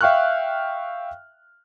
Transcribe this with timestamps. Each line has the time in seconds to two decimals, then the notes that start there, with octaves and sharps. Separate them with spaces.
0.01 E5 F5 G5 C#6 F6 F#6